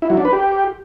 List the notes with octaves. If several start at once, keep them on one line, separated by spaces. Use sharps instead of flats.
E4
F#3
D4
B4
G4